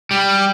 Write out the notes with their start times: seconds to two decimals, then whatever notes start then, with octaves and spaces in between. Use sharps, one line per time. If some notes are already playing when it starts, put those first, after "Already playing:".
0.11 G3